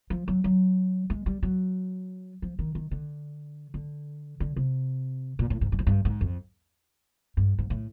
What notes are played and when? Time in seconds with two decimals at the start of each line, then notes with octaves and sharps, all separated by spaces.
0.10 F3
0.28 F#3
0.44 F#3
1.10 G#3
1.26 G3
1.43 F#3
2.42 F3
2.59 D#3
2.75 D#3
2.91 D3
3.74 D3
4.40 D3
4.56 C3
5.39 A#2
5.50 A2
5.61 G#2
5.72 G2
5.79 G#2
5.87 G2
6.05 G#2
6.21 F2
7.37 G2
7.58 G#2
7.70 A2